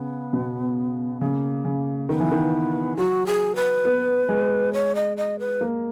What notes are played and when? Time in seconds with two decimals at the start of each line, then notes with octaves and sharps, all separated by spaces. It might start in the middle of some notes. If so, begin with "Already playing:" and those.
Already playing: C#3 B3
0.33 B2
1.21 C#3 A#3
1.65 C#3
2.09 D#3 B3
2.20 E3
2.31 D#3
2.97 F#3 F#4
3.27 G#4
3.56 B4
3.85 B3
4.29 G#3
4.73 C#5
4.95 D#5
5.17 D#5
5.39 B4
5.61 A#3